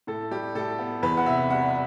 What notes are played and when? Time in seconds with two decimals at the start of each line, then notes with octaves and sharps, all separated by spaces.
0.07 A2 A4
0.31 G3 G4
0.55 A2 A4
0.79 B3
1.02 E2 B4
1.17 F#5
1.26 C3 E5
1.50 G3 F#5
1.68 F#5